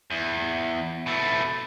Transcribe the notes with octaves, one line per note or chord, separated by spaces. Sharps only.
E2
B2 A3